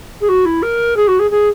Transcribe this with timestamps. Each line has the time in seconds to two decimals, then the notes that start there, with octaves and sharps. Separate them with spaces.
0.21 G#4
0.29 F#4
0.45 E4
0.62 A#4
0.97 G#4
1.08 F#4
1.19 G#4
1.31 G#4